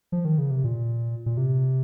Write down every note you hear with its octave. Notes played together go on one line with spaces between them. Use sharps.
F3
D#3
C#3
C3
A#2
A#2
C3